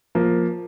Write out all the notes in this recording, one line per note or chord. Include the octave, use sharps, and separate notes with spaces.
F3 A#3